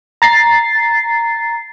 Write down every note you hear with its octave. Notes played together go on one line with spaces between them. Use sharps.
A#5 A6 C7